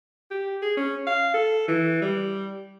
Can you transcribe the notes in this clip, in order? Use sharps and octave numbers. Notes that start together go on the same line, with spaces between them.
G4
G#4
C#4
F5
A4
E3
G3